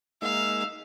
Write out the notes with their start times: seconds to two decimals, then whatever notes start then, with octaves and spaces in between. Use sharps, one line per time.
0.22 G#3 A#3 D#4 E5 F5